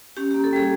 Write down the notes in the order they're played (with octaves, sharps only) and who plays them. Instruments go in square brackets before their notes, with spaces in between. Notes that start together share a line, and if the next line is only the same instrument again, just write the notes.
[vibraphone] C#4 G4
A#3 G4
A4
G3 G#4